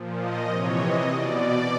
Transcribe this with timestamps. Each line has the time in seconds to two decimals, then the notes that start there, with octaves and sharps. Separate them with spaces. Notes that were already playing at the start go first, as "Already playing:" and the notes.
Already playing: A#2 F3
0.20 D#5
0.49 C3 E3 C#5
0.78 D#5
1.08 B2 D5